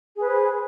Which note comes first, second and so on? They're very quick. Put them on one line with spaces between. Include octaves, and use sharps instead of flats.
G#4 B4 C5